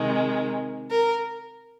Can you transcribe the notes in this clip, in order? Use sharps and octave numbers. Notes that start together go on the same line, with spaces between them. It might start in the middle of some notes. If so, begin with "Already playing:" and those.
Already playing: C3 D#3 G#3
A#4